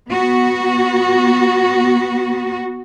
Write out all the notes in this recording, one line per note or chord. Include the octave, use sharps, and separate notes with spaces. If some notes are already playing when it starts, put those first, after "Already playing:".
B3 F#4